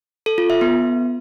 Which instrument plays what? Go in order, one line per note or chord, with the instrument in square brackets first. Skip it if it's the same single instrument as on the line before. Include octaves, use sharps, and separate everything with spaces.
[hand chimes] A4
F4
E5
B3